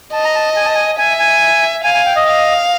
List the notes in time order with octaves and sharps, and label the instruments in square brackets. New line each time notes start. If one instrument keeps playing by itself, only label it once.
[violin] D#5 [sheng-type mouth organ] A5
[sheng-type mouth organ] A#5
A5
G#5
A5
G#5
[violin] E5 [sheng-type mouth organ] G#5
[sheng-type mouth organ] G#5
[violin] F5 [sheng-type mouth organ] G#5
[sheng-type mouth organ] G#5
G5
D#5
[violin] F5